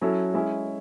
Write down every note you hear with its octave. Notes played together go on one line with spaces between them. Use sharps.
F#3 C#4 E4 A4
G#3 C#4 E4